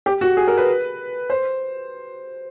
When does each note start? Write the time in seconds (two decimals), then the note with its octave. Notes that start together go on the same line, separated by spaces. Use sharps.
0.06 G4
0.21 F#4
0.37 G#4
0.48 A#4
0.57 B4
1.30 C5